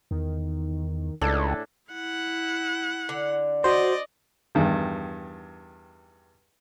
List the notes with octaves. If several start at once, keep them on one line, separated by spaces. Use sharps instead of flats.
E2 D#3
C#2 A2 D4 A4
E4 F#5
D3
F#4 C5 D5 D#5
E2 G2 D#3